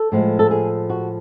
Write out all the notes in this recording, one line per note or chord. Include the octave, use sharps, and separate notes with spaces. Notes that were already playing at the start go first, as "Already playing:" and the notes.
Already playing: A4
A2 F3 G#3
A4
G#4
F#4